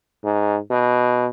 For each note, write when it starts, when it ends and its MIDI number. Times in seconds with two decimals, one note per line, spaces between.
0.24 0.57 44
0.70 1.29 47